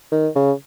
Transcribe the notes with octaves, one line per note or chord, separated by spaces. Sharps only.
D#3
C#3